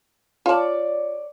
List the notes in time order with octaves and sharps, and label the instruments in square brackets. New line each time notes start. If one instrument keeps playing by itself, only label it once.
[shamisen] F4 A5 [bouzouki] C#5 D5